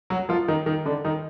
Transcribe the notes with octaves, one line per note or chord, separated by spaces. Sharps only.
F#3 F#4
F3 F4
D#3 D#4
D#3 D#4
D3 D4
D#3 D#4